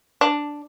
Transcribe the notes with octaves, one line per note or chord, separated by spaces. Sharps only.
D4